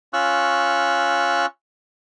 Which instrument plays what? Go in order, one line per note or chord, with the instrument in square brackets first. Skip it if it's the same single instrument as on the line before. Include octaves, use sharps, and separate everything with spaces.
[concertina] C#4 F4 C#6 E6 F#6